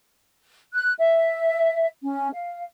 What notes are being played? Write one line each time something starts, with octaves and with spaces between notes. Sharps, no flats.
F#6
E5
C#4
F5